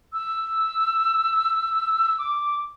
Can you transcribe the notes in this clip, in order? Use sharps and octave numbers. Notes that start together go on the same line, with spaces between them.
E6
D6